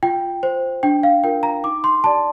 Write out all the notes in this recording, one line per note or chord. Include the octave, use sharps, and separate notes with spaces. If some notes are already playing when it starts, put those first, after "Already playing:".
F4 G5
C5
D4 G5
F5
F4 A#4 G5
A#5
D#4 D6
C6
G4 D5 A5